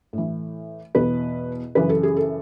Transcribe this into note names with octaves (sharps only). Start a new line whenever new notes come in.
A2 E3
E2 B2 B4
F#2 C#3 E3 B4
A4
G#4
A4